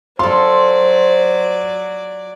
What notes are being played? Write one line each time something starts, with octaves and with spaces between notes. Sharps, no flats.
F#3 F4 A4 C5 D5 C6